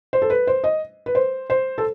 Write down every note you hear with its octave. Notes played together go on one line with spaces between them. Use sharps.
C5
A4
B4
C5
D#5
B4
C5
C5
A4